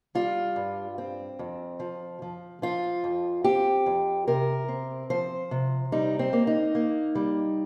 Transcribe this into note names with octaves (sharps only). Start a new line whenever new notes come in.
G3 F4
G2
C4
F2
F3
F3
F3 F4
F2
C4 G4
F2
C3 A#4
C4
F3 C5
C3
G3 D#4
C4
A#3
D#4
A#3
G3